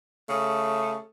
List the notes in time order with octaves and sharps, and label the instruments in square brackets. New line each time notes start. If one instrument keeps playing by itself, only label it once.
[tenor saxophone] C#3 [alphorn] A3